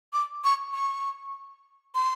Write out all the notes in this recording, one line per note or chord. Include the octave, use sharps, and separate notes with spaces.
D6
C#6
C#6
C6